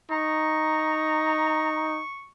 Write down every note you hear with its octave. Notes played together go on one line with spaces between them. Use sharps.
D#4 A#5 C#6